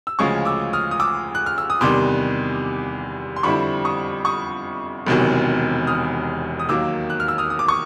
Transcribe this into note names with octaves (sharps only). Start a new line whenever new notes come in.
E6
D2 C#3 F3 G#3 C#4 C#6 D#6
D6 E6
D#6 F6
D#6
D6 E6
F#6
F6
E6
D#6
E2 C3 D#3 G3 C6 D6
C6
F2 D3 G3 C4 E4 B5 C#6
C#6 D#6
C#6 D#6
E1 E2 C3 D#3 F#3
D#6 F6
D#6
D#2 D#3 F#3 A#3 D6 E6
F#6
F6
E6
D#6 F6
D#6
D6
C#6 D#6